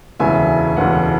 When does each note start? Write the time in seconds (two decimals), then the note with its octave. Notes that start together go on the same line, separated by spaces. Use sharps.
0.20 E1 D2 C#3 E3 E5 G#5
0.76 E1 D2 C#3 E3 F#5